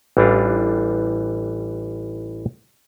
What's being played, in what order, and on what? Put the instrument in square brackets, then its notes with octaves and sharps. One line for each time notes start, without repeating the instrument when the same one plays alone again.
[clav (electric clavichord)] A1 E3 G3 D4 D#4 F4